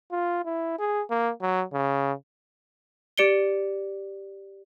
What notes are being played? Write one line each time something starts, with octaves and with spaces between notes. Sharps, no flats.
F4
E4
G#4
A#3
F#3
C#3
G4 D5 C#7 D7 G7